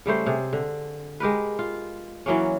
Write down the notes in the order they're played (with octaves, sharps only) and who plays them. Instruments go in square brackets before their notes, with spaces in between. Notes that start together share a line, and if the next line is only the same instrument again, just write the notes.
[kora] C#3 G3 A3 C5
C3 G#4
D3
G#3 G4 A#4 B4
F4
E3 F#3 A#3 C#4